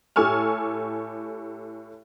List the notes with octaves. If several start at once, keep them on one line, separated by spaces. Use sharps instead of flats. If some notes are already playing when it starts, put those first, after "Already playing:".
A2 G4 A4 G#5 C#6 F6